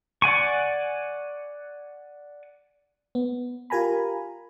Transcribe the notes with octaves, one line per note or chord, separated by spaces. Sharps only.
D5 F#5 G#5 C#6
B3
F4 G4 A#4 G#5 A#5 B5